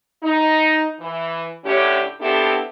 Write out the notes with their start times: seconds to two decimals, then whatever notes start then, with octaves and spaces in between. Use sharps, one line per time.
0.23 D#4
1.00 E3
1.65 A2 D3 C#4 E4 G4
2.21 B3 C4 D4 E4 G4 A4